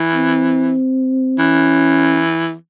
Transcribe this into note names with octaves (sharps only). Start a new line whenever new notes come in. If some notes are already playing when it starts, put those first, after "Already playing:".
Already playing: E3
C4
E3 C#4